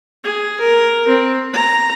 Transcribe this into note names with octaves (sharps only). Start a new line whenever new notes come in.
G#4
A#4
C4
A#5